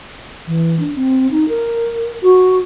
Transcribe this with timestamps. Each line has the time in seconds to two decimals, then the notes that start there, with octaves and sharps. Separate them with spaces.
0.47 E3
0.79 D4
0.95 C4
1.31 D#4
1.48 A#4
2.23 F#4